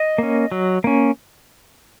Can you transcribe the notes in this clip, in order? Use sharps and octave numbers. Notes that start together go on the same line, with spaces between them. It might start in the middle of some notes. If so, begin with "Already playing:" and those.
Already playing: D#5
A#3 C#4
F#3
A#3 C#4